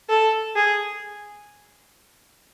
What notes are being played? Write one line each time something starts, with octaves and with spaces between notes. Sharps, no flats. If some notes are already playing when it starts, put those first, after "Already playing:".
A4
G#4